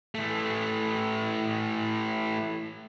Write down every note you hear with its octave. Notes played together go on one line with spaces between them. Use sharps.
E3 A3